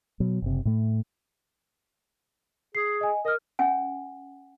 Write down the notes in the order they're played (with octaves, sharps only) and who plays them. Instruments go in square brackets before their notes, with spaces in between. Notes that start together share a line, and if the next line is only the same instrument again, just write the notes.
[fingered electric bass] B2 F#3
F#1 C3
A2 A3
[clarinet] G#4 [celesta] C7
[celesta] D#5 G#5
[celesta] A#4 F6 [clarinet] D#5
[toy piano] C#4 F#5 G#5